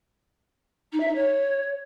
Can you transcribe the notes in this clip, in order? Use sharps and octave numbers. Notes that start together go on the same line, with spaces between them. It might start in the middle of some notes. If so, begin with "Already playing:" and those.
D#4
E5
D#4
C#5